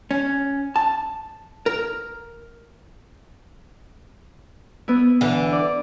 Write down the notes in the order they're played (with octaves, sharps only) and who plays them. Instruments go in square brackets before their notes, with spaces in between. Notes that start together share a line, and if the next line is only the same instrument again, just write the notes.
[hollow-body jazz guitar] C#4
A5
A#4
[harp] B3 E4
[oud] D3 E3
[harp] D5